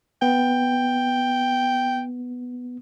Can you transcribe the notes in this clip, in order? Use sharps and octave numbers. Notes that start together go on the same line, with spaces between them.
B3 G5